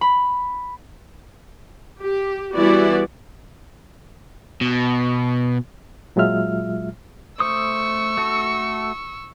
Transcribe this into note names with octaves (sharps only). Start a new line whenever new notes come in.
B5
G4
E3 G3 B3 E4 F#4 D5
B2
A#2 F#3 G#3 F4 E5 F6
A3 C5 C#6 D#6 E6
A3 F#4 A4